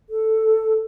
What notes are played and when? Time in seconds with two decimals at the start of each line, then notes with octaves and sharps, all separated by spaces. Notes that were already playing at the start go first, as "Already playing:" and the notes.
0.10 A4